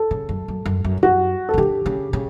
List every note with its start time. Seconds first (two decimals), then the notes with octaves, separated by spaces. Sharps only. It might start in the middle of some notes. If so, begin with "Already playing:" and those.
Already playing: A4
0.11 C#3
0.29 F#2
0.48 F#2
0.66 F#2
0.84 F#2
1.03 F#2 F#4
1.49 A4
1.54 C#3
1.58 D3 G4
1.86 C#3
2.13 C#3